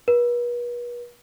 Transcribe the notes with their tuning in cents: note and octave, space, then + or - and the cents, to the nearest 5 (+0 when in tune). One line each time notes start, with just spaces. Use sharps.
B4 -40